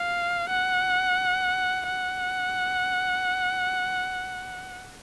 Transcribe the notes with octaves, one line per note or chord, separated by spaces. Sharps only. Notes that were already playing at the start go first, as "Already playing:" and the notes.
Already playing: F5
F#5
F#5